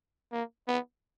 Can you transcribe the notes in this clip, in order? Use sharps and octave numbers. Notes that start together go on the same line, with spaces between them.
A#3
B3